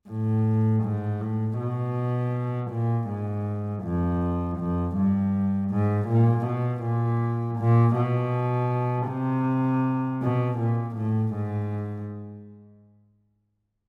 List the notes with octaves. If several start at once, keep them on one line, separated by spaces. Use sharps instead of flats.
A2
G#2
A2
B2
A#2
G#2
F2
F2
G2
G#2
A#2
B2
A#2
A#2
B2
C3
B2
A#2
A2
G#2